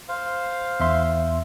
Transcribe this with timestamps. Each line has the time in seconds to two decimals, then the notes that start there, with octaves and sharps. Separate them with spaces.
0.09 C5 F5
0.80 E2 E5 C6